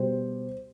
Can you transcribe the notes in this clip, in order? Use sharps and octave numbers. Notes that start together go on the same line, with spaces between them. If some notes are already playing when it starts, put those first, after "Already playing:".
Already playing: B2 G3 C5